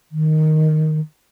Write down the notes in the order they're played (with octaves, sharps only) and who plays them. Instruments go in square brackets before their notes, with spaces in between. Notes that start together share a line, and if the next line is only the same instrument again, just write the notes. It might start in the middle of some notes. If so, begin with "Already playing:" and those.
[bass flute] D#3